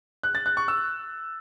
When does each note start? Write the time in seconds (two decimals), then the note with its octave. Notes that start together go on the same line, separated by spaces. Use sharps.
0.23 F#6
0.35 A6
0.46 F#6
0.57 C#6
0.68 E6